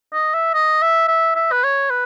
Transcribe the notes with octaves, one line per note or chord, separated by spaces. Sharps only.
D#5
E5
D#5
E5
E5
E5
B4
C#5
B4